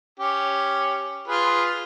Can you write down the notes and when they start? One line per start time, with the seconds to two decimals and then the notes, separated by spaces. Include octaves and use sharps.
0.19 C#4 G4
1.28 F4 G#4 B4